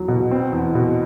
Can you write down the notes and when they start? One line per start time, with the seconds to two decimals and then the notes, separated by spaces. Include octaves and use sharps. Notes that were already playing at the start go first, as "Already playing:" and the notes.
Already playing: E2 F#3
0.08 B2
0.31 C4
0.52 E2
0.75 B2